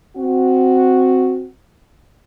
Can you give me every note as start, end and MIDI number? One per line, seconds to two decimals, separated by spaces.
0.17 1.47 60
0.17 1.47 66